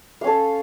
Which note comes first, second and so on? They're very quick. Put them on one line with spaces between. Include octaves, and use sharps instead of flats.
F5 C#4 A4